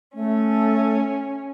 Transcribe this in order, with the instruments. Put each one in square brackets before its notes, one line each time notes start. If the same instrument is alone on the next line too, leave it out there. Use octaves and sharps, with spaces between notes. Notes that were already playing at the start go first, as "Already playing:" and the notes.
[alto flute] A3 [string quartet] C#4